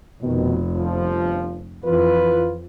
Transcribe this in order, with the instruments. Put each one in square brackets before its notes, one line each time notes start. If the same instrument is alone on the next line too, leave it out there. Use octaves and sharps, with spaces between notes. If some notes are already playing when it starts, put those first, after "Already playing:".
[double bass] F1 [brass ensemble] B2 D#3
[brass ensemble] G1 F3
[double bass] F2 [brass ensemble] E3 F4 B4